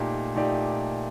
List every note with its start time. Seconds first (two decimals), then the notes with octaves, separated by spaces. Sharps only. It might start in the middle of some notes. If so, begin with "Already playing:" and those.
Already playing: A#2 A3 D#4 G4 D5
0.36 A#2 A3 D#4 G4 D5